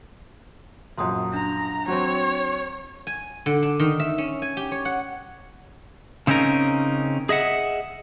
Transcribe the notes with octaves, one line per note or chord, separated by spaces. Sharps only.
A#1 F#2 C6 D#6
D4 A#5
F#3 C4 C5 C#5
G#5
D3
D4
D#3
E5
C#4
G#5
G4
C#5
F#5
C#3 C4 C#4 D#4 A#4
G#4 D#5 E5 F#5